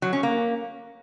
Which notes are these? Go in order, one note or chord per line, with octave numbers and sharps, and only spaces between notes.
F#3
C#4
A#3